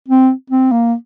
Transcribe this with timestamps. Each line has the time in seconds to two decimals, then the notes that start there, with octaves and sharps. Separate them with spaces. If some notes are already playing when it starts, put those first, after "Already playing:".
0.08 C4
0.50 C4
0.72 A#3